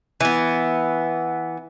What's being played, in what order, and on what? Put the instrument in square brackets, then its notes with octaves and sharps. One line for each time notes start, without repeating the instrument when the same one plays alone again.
[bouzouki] E3 B3